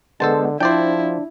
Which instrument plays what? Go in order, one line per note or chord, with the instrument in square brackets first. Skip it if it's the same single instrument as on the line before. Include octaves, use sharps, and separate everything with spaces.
[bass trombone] D3 [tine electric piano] G#3 B3 [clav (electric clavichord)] A4 C5 A5
[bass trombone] F3 [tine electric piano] D4 [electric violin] E4 [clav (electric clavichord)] C5 D5 G5